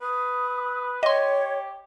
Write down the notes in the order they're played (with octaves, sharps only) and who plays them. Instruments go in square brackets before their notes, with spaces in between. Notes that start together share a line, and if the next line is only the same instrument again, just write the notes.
[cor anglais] B4 [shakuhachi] D#6
[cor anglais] G4 [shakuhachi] C#5 [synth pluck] D#5 C6